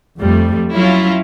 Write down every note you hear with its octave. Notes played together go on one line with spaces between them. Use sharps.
F2 G3 A3
F#3 C#4 E4 F4